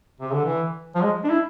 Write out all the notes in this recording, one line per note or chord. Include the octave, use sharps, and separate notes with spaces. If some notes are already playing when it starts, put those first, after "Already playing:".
C3
D3
E3
F3
G#3
D4
E4